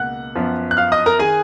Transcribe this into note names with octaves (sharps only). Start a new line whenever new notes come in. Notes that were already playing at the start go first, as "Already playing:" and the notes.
Already playing: C#2 B2 A#3 F#5 F#6
F#2 F3 B3
F#6
F5 F6
D#5 D#6
A#4 A#5
D#3 G#4 G#5